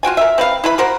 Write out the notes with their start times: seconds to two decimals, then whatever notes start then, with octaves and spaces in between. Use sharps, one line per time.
0.03 F4 F#4 G5 G#5
0.17 A#4 E5
0.38 C4 B4 F5
0.64 E4 B4 B5
0.78 F#4 A#4 C5 F#5